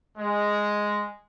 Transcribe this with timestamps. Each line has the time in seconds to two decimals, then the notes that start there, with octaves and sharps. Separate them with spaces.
0.17 G#3